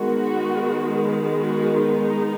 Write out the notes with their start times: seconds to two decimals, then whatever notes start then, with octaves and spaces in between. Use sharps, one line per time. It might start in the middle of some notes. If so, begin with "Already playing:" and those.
Already playing: D#3 G#3 B3 F#4
1.37 F#4
1.76 D#4